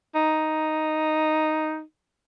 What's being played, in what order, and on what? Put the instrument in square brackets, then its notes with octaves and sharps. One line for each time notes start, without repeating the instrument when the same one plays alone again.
[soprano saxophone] D#4